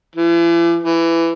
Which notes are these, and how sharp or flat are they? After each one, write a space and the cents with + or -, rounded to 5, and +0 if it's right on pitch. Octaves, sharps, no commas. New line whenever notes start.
E3 +40
E3 +15